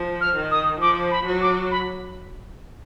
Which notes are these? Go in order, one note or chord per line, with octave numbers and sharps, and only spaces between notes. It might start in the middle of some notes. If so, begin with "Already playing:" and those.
Already playing: F3
F6
D#3
D#6
F3 D6
B5
F#3
D6
B5